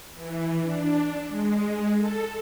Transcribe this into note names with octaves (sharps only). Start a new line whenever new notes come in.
E3
D4
G#3
A4